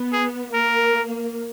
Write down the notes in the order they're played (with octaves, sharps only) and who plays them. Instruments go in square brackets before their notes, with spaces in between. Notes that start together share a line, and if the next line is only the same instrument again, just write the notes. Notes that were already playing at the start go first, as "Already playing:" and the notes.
Already playing: [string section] B3
[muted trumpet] G#4
[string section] A#3 [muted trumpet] A#4